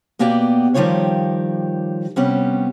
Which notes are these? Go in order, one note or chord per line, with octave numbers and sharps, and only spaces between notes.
B2 A#3 B3 G4 D5 G5
D#3 F3 G3 F4 G4 C#5
C3 G3 B3 C#4